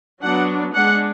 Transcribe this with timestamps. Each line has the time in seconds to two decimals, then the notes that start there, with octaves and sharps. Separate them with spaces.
0.23 F#3 B3 D4 F#5
0.74 G#3 D4 F#5